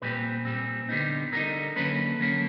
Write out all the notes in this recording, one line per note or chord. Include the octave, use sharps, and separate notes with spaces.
A#2 G3 C4 B4
A#2 G3 C4
D3 G3 B3 D#4
D3 G3 B3 D#4 A#4
D3 F#3 A#3 C#4 B4
D3 F#3 A#3 C#4